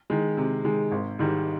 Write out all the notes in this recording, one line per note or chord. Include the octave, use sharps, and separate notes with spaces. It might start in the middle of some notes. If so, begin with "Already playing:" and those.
D#3 G#3
C3
D#3 G#3
G#1
G#2 D#3 G3